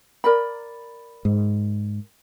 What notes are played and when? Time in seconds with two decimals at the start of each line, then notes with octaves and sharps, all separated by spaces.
0.24 A#4 D5 B5
1.25 G#2